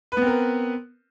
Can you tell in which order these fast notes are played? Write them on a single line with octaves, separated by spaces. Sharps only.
B4 B3 C4 A#4